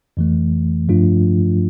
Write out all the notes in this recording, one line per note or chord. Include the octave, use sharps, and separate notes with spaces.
F2 E3 A3
G2 F3 A3 D4 F4